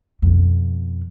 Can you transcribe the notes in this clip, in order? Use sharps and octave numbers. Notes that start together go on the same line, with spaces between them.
F2 B2